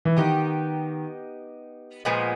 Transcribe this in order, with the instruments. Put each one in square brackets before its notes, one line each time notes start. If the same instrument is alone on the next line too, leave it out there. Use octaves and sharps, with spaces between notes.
[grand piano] E3
[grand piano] D#3 [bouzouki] B3 D#4 G4
[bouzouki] A#2 F3 G#3 B3